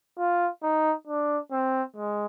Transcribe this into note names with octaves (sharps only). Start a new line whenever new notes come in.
F4
D#4
D4
C4
G#3